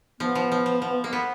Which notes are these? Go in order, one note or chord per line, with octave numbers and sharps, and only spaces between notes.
F3 B3
F3
F3
F3
F3
A#3
B3